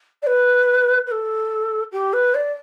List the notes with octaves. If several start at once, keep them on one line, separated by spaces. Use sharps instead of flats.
D5
B4
B4
A4
G4
B4
D5